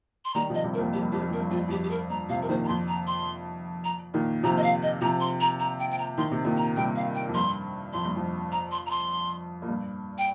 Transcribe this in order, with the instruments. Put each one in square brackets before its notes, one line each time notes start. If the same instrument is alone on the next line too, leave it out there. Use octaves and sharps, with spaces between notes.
[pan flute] C6
[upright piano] D#3 G3 [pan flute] A#5
[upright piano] C3 F3 [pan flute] D#5
[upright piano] G2 C3
[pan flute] A#4
[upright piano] F2 A#2
[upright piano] F2 [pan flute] G4
[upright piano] G2
[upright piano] F2 [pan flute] G4
[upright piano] G2
[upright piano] F2 [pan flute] A#4
[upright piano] G2
[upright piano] F2 [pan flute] F4
[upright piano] G2
[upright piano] F2 [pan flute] G4
[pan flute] G4
A#4
[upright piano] G2 [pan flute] A#5
[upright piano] C3 F3 [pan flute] F5
[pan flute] A#4
[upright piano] A#2 D#3 [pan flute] C5
[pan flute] A#5
[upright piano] F2 [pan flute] C6
[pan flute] A#5
C6
A#5
[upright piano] A#2 D#3
[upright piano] C3 F3 [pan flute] A#5
[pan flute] D#5
F5
D#5
[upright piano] C3 F3 [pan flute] A#5
[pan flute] C6
A#5
A#5
G5
G5
A#5
[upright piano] D#3 [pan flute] C6
[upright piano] C3
A#2 D#3
[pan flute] A#5
[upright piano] G2 C3 [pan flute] G5
[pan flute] F5
G5
[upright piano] F2
[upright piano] G2 [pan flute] C6
[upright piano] F2 [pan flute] C6
[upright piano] G2
F2
[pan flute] A#5
C6
A#5
C6
[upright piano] A#2
G2
[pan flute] G5